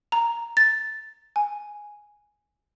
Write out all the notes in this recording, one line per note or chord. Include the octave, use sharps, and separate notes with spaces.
A#5
A6
G#5